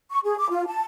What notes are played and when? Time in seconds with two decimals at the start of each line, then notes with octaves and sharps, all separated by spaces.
0.10 C#6
0.23 G#4
0.38 D6
0.50 F4
0.67 A5